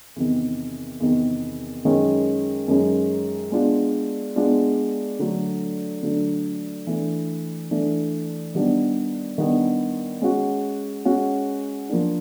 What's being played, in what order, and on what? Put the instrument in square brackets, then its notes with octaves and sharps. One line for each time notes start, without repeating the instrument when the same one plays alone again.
[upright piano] E2 C3 D#3
E2 C3 D#3
F#2 D#3 G#3 C#4
F#2 D#3 G#3 C#4
G#3 B3 D4 F4
G#3 B3 D4 F4
D3 F#3 A3 D4
D3 F#3 A3 D4
E3 A3 D4
E3 A3 D4
D#3 G3 B3 D4
D#3 G3 B3 D4
G#3 C#4 F#4
G#3 C#4 F#4
F3 A#3 D4